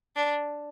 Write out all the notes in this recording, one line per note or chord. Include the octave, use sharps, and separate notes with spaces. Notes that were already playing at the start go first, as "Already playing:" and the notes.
D4